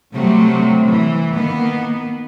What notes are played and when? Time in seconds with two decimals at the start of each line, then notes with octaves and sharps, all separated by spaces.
0.13 C3 F#3 G3 A3
0.87 E3
1.35 D#3 A#3 B3